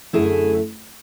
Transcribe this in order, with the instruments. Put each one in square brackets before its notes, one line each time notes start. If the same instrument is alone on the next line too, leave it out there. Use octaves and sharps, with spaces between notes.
[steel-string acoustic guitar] F#2 D3 A3 E4 G#4